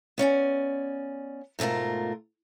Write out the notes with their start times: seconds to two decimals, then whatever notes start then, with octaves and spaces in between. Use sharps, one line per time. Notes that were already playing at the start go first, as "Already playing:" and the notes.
0.18 B3 C#4 D5 G#5
1.59 G#2 B2 A3 F4 A#4